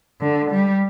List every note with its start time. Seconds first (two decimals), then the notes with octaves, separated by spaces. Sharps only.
0.21 D3
0.51 G3